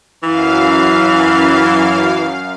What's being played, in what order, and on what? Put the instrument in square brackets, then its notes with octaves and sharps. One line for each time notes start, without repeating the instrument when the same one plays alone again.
[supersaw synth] F#2 F5 [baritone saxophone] E3